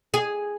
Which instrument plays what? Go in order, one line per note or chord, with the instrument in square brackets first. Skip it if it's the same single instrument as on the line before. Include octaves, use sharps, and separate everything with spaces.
[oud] G#4